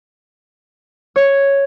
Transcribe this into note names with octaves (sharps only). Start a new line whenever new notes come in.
C#5